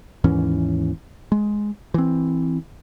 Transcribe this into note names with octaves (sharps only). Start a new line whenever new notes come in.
D#2 G#2 E3 C#4
G#3
E3 C4